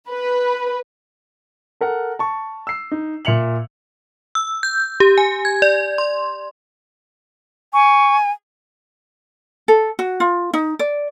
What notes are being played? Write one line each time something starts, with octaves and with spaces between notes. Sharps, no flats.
B4
A4 A#4 F#5
A5 C#6
E6 C7
D#4
A#2 E5 C#7 F7 F#7
E6
G6
G4
G#5
G#6
D5
C6
G#5 C#6
A4
F#4
F4
D#4
D5